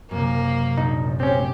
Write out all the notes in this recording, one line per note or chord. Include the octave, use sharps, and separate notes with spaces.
F#2 C3 A#3
A#1 D#4
C4 C#4 G4